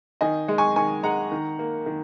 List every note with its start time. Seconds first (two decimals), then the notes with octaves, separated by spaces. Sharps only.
0.21 D#3 D#5 G#5
0.48 G#3
0.58 G#5 C#6
0.76 D#3 G#5 C#6
1.03 G#3 F#5 A#5
1.32 D#3
1.59 A#3
1.86 D#3